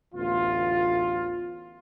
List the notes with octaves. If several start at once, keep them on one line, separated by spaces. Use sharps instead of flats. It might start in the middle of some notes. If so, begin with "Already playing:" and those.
A1 D2 B3 F4